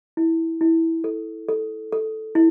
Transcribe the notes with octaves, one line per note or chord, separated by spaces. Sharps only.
E4
E4
A4
A4
A4
E4